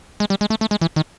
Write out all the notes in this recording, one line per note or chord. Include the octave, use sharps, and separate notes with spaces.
G#3
G3
G#3
A3
A3
G#3
E3
D#3